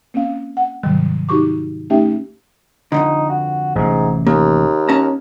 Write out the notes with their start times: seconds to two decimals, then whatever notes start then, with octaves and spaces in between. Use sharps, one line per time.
0.14 A#3 C4 C#4 F5
0.57 F#5
0.83 G#2 C3 D#3 F#3 G3
1.29 D#4 F#4 G4 C#6 D6
1.90 A3 C#4 D#4 G4 E5 G5
2.92 F2 G#2 D3 D#4
3.30 F#4
3.75 A1 G#2 C3
4.26 D#2 A#3
4.89 C#4 A5 A#5